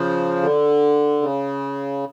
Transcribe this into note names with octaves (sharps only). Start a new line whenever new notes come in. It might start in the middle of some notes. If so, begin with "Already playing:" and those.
Already playing: C#3 F3
D3
C#3